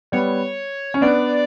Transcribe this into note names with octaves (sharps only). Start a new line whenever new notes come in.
G3 B3 C#5
C#4
B3 D4 D5